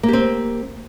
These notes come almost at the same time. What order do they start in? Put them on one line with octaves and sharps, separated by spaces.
A#3 G4 C4